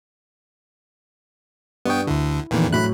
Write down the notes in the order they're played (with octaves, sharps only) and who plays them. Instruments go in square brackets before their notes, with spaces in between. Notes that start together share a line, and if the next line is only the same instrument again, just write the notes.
[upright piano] G2 C#6 D#6 [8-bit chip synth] B3 G5
[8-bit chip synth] D2 D3 [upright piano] E4
[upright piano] F1 E2 [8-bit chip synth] A#2 D#3 E3
[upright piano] A2 F#3 [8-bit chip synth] B5 F#6